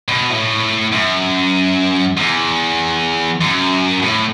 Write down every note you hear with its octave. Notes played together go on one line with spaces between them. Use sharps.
B2
A2
F#2
E2
F#2
A2